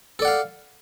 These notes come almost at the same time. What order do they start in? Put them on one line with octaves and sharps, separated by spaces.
A4 D5 F#5 F5